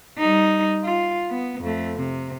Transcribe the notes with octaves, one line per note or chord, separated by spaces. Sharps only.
G3 D#4
F4
B3
F2 A3
C3